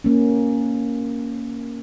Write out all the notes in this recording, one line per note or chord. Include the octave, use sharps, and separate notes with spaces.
A#3 C#4